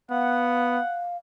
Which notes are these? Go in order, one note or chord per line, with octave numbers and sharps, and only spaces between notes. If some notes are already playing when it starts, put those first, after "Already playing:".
B3 F5 F#5